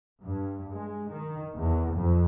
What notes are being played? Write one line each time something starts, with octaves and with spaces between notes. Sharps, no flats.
G2
G#3
D#3
E2
F2